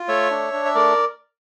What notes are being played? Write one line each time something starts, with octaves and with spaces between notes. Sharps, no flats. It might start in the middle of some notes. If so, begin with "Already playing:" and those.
Already playing: F4
A3 C#5 E5
D4
D4
E5
A3 A#4 D5